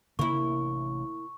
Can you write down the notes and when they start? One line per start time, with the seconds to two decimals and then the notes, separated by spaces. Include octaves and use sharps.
0.19 A1 C3 A#3 D4 E4 C#6